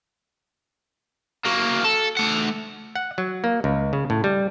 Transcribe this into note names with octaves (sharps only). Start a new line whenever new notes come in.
F#3 A#3
A4
A3 F#5
F#5
F#3
A#3
C#2
C#3
A2
G3